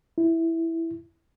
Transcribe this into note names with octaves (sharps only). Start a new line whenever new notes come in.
E4